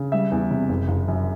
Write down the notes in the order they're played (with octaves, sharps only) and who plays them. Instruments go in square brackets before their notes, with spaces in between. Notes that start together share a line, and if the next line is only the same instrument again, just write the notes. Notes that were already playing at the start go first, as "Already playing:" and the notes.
Already playing: [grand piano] C#3
G3 E5
E2
C3
F#1
F#1
F#2